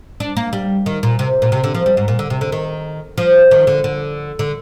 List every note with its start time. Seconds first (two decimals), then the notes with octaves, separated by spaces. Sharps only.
0.20 D4
0.37 A#3
0.53 G3
0.86 D#3
1.03 A#2
1.19 C3
1.42 A#2
1.52 C3
1.64 D3
1.75 F3
1.86 G3
1.97 G#2
2.08 A#2
2.19 D3
2.30 C3
2.41 D3
2.52 D#3
3.18 F3
3.51 D#3
3.67 D3
3.84 D3
4.39 D3